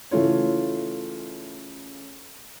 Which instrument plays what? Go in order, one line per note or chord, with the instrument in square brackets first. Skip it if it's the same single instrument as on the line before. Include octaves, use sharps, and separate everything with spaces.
[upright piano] C#3 E3 A3 F4 C#5